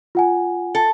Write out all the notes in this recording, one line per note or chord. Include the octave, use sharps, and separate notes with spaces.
F4 F#5 G#5
A4